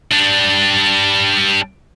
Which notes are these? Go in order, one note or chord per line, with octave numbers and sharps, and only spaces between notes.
G3 D4